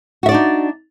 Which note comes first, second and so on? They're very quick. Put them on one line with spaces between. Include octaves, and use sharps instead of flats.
F#4 E5 D5 D4 D#4